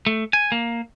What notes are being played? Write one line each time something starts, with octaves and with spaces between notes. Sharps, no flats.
A3
G#5
A#3